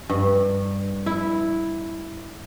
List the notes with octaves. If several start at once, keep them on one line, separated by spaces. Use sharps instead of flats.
G2
E4